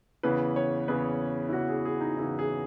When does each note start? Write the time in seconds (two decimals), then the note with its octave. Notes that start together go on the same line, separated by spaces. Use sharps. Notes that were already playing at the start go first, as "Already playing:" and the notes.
0.23 E2 C#3 E3 B4
0.56 C#5
0.88 E2 C#3 E3 B4
1.49 E4
1.53 E2 C#3 E3 F#4
1.69 G#4
1.85 G#4
2.01 D#4
2.17 E2 C#3 E3 E4
2.39 G#4